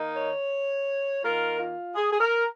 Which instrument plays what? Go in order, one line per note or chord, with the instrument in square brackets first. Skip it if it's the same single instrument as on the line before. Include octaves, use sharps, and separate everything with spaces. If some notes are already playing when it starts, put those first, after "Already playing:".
Already playing: [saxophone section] D#3 A#3 D#4
C#5
D#3 A#3 F4 A#4
F4
G#4
G#4
A#4